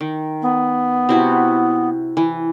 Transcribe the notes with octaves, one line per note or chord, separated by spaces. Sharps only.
D#3
B3
C3 E4 F#4
E3